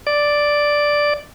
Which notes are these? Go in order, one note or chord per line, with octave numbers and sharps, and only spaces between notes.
D5